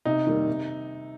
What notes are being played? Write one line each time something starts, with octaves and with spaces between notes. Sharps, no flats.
C3 D#4
D#3 G3 A#3
C3